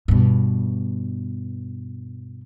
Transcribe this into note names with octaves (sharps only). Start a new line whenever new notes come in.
G2 B2